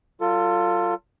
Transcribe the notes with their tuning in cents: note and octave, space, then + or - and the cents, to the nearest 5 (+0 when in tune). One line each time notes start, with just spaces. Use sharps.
F#3 +25 F4 +0 A4 +30